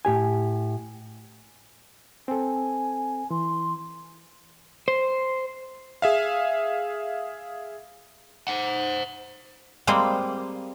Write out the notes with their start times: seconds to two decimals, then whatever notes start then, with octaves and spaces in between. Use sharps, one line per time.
0.05 A2 G4 G#5
2.28 C4 A4 G#5
3.31 E3 C6
4.88 C5
6.02 G#4 E5 F5
8.48 C5 F#5
9.87 G3 G#3 A#3 C4